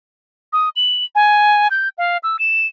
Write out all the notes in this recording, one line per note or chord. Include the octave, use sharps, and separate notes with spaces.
D#6
F#7
G#5
G6
F5
E6
E7